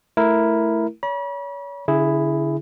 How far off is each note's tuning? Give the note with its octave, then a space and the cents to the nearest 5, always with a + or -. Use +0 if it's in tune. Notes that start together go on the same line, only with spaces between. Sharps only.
A3 +0 E4 +0 A#4 +0
C#5 +35 B5 -40
D3 -40 E4 +5 G#4 +0